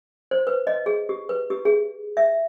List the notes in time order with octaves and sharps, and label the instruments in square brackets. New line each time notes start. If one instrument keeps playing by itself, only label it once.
[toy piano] C5
B4
D#5
G#4
G4
B4
G4
G#4
E5